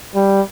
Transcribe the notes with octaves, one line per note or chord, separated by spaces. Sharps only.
G3